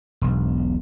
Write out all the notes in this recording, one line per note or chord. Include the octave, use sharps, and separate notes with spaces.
E1 B1